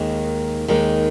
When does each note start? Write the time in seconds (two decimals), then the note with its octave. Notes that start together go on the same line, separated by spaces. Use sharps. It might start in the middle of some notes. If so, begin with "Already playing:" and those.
Already playing: D#2 D#3 G#3
0.68 D#2 D#3 G#3